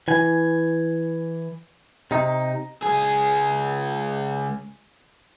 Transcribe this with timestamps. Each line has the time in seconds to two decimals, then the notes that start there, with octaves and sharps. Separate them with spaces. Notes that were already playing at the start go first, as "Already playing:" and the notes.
0.08 E3 G#5
2.11 C3 D#4
2.82 C#2 G#4